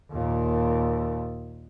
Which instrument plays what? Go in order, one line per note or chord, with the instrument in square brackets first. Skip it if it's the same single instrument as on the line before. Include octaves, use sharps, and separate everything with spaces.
[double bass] D#2 A#2